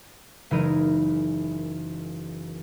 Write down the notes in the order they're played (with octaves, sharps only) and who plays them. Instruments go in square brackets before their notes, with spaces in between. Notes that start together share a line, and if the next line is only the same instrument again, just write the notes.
[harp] F#1 E3 G#3 D#4 A#4 D#7